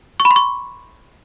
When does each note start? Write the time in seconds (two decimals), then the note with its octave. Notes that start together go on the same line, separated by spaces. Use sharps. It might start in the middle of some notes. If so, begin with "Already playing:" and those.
0.20 C#6
0.25 B5
0.31 C6
0.36 C#6